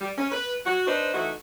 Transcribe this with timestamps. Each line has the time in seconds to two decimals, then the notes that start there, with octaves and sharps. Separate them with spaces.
0.01 G3
0.18 C#4
0.32 B4
0.66 F#4
0.87 D4 D#4 B4 C5
1.14 E3 A3 D#4 F#4